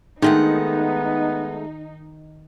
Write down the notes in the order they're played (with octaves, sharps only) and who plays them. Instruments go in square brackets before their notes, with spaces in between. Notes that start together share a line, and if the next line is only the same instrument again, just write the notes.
[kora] D#3 [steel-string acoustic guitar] G#3 A3 F#5 [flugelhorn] B3 [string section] D#4